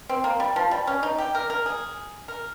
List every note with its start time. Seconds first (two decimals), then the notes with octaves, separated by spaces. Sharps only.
0.09 C4
0.24 A#3
0.40 G3
0.56 F3
0.71 G3
0.87 C#4
1.03 D#4
1.18 G4
1.35 A#4
1.50 A#4
1.66 G#4
2.28 A#4